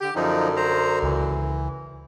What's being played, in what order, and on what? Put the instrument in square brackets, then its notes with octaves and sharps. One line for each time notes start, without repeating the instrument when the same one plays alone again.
[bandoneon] D3 [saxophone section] G4
[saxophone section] F#2 D3 [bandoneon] F3 D#4
[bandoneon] C5 A#5
[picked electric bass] C#2 [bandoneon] E3